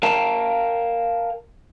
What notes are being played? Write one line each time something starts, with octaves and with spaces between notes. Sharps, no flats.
A#4 F5 G5 A5 A#5